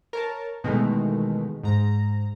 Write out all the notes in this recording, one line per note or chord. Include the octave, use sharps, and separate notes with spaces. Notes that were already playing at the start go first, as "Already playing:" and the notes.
A#4 C#5 A5
B2 D#3 E3 G#3 A3
G#2 A#5